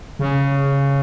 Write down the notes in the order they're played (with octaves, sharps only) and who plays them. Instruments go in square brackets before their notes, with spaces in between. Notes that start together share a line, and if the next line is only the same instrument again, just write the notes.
[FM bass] C#3